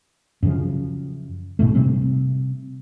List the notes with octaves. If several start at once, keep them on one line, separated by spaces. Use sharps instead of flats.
F#2 C#3 F3
A#1 G#2 B2 A3
C3 G3 C4